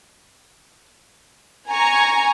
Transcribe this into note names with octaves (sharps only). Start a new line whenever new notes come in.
G#5 A#5 C#6